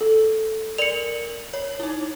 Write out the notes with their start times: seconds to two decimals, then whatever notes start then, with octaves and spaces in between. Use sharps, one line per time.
0.01 A4
0.78 A#4 D5 C#7 F7 F#7
1.54 C#5
1.80 D#4 E4